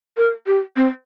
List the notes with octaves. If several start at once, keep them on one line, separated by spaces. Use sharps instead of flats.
A#4
G4
C4